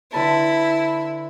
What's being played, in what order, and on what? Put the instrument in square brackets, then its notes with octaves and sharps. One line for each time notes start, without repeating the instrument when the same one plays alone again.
[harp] D3 B4 A5 [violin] E4